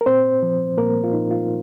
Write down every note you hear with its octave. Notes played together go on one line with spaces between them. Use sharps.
A#4
A#2 C4 C5
F3
A#2 A#3 A#4
F4
A#2 D#4
F4